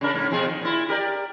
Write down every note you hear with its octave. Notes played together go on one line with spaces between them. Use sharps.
C#3 D4 A#4
G#2 C#3 A#3
F2 B2 G#4
D#3
A#2 E4
G4 A#4 D5